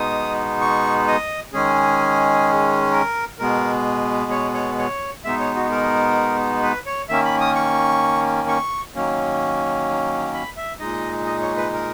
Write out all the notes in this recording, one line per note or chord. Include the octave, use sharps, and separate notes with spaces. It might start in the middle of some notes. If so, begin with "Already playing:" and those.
Already playing: B2 G#3 B3 D#4 D#6
C#6
D#5
D#3 G#3 C#4 G#4
A#4
B2 G#3 B3 A#4
C#5
C#5
C#5
B2 G#3 B3 D#4 E5
C#5
F#4
A#4
B4
C#5
D#3 A#3 C#4 E5
B5
D#6
C#6
C#6
D#3 F#3 A#3 C#4
B5
E5
A#2 G#3 D#4 D#5
D#5
C#5
B4
A#4